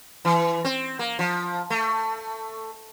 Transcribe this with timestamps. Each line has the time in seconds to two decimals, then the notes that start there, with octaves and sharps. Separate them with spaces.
0.25 E3
0.65 C4
0.99 A#3
1.19 F3
1.70 A3